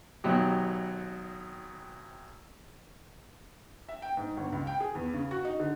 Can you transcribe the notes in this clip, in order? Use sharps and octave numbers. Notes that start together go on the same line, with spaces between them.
G#1 B2 F#3 G4
E5
G5
G#2
G1
C#2
G5
G#4
E2
C#3
F#4
D#4
D3